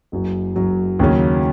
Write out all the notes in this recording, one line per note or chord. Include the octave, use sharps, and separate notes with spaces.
F#1 F#2 F#3
F#1 F#2 F#3
D#2 C#3 F#3 C#4